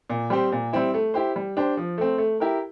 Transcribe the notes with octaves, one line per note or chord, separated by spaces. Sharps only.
A#2
G3 C4 G4 C5
A#2
G3 C4 E4
A3
E4 G4 C5
G3
D4 G4 C5
F3
A3 C4
A3
E4 G4 A#4